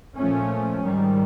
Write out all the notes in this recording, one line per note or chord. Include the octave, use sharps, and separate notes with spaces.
A#2 F3 A3 C#4
G#2 D#3 G3